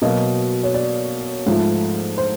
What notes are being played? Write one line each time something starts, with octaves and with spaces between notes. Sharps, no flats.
B2 F#3 A#3 D#5
C#5
D5
G#2 F3 A3
C5